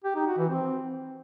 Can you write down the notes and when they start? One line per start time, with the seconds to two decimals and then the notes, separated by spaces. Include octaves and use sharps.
0.04 G4
0.15 D#4
0.27 F#4
0.38 E3
0.49 C4